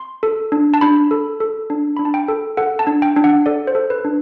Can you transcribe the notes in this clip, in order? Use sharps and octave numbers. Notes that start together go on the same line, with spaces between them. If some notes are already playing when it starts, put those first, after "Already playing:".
Already playing: C6
A4
D4
A5
D4 B5
A4
A4
D4
D4 B5
A5
G5
A4
A4 F#5
A5
D4
G5
D4
F#5
A4 D5
C5
A4
B4
D4